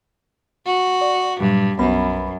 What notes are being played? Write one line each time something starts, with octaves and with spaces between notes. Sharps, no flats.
F#4
D5
G2 A#2 F#3 G3
B1 F#2 B3 B5